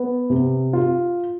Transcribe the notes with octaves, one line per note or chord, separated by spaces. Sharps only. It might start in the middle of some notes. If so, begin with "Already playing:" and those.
Already playing: B3
C3
F4